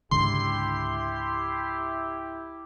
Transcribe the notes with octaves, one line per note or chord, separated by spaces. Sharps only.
C#2 G#2 D3 E4 G4 C6